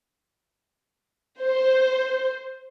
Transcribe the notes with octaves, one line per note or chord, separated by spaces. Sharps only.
C5